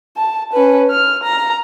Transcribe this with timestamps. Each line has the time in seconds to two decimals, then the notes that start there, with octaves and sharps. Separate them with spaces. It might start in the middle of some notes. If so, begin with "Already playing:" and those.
0.17 A5
0.53 C#4 B4
0.90 F6
1.23 A#5